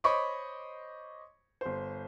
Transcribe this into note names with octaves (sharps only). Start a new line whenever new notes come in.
C5 C#5 D#5 B5 C#6 D6
G1 C5